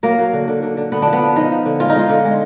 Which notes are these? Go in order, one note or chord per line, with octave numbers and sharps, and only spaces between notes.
F#3 A#3
F#3
D3
D3
D3
D3
D3 B3
F3 D4
B3
F3
F3 D#4
F3
D3
G#3 F4
D#4
G#3 F4
D3
G#3